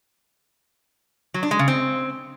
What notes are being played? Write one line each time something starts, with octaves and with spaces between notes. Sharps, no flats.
F#3
D4
G#3
C#3
C4